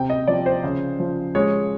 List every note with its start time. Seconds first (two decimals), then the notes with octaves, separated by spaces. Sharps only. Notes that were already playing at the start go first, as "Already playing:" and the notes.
Already playing: C3 G5
0.10 D#5
0.27 F3 D5
0.46 C5
0.64 C#3
0.99 F3
1.35 G#3 C#5